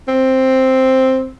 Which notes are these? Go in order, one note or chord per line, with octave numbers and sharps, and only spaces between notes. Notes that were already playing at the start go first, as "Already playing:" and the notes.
C4